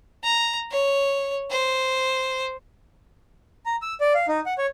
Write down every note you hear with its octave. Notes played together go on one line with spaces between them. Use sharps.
A#5
C#5
C5
A#5
E6
D5
F5
D#4
F#5
C#5